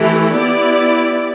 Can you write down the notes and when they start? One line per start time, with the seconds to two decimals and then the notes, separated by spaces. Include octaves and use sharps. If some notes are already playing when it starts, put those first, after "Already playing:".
Already playing: E3 A3 E4 G4
0.35 B3 E4 G4 D5